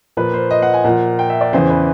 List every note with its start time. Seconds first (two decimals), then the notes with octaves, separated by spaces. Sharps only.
0.17 A#2 F3 B4
0.34 C5
0.51 D#5
0.62 F#5
0.74 G#5
0.84 A#2 F3 F#5
1.19 G5
1.30 E5
1.41 D5
1.53 E2 C#3 E3 C5
1.70 B4